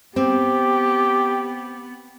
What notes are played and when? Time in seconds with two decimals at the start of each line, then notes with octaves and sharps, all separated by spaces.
0.16 B3 C4 G4